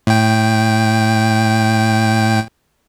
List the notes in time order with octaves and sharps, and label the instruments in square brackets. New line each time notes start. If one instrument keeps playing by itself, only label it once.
[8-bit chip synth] A2 G5